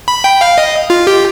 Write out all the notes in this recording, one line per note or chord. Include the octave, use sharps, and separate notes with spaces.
B5
G5
F5
D#5
F4
G4